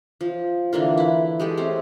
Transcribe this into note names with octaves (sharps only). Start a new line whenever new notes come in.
F3
D3 E3 A#3 F4
E4 B4
G#3 G4 A4
A3 C4 C#5 F5